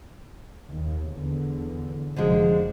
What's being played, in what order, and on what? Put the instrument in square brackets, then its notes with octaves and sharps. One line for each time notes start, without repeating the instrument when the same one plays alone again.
[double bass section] D#2
E2 D3
[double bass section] F1 [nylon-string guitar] D3 F3 G#3